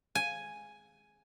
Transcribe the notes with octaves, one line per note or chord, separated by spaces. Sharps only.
G#5